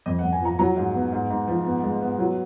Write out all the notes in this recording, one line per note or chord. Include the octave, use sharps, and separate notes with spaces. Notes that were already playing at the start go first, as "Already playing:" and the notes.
F2 D#5
F2 F#5
G#5
F3 A#5
F#3 A#5
G#2
B3
G#2
G#2
F3
B3
G#3
B3
F#3